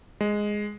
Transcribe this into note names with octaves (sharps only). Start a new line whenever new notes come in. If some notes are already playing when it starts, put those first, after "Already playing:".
G#3